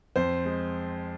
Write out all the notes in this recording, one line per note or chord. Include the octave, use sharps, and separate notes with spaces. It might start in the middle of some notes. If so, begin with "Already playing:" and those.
F2 C5
G#3